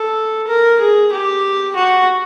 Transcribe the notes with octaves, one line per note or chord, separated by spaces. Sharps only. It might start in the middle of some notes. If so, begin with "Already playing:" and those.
Already playing: A4
A#4
G#4
G4
F#4